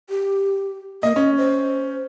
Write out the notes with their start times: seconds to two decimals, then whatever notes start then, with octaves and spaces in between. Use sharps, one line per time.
0.10 G4
1.03 A#3 D#5
1.16 C#4 D#5
1.37 C5